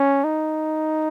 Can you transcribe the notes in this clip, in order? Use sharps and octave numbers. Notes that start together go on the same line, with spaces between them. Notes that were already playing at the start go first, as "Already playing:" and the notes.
Already playing: C#4
D#4